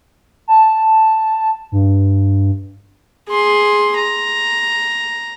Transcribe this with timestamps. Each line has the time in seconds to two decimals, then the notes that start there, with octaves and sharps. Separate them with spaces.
0.48 A5
1.72 G2
3.29 G#4 C6
3.97 A#5